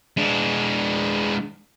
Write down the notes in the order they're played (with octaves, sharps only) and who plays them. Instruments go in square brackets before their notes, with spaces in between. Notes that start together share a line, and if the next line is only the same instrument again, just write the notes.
[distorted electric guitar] G#3 D4